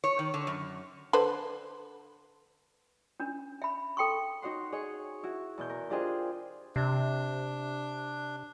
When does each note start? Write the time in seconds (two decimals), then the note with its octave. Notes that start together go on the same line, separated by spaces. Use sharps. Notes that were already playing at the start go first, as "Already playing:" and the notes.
0.04 C#5
0.19 D#3
0.34 D3
0.47 F#2
1.13 D3 B4 C5
3.20 C#4 D4
3.62 E5 B5
3.97 A4 G5 C6 C#6
4.42 D#4 F#4 C#5 F#5 C6
4.72 G#4 C#5 D#5 C#6
5.23 E4 F#4
5.58 E2 B2 G6
5.69 A#4
5.90 D4 F4 G4 G#4 C5 D#5
6.76 C3 D4